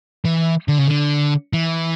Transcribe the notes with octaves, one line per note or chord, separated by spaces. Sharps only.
E3
D3
C#3
D3
E3